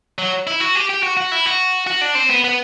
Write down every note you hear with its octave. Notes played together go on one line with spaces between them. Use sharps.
F#3
E4
F#4
G4
G4
F#4
F#4
E4
F#4
F#4
D4
C4
B3
B3